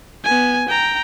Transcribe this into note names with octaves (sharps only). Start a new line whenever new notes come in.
B3 G#5
G5 A#5